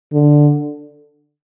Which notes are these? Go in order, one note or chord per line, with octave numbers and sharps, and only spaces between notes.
D3